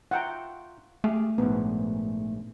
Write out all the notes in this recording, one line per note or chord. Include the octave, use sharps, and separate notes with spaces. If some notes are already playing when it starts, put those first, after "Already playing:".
F4 E5 F#5 G5 A#5
A3 G4 G#4 F5
A#1 G#2 B3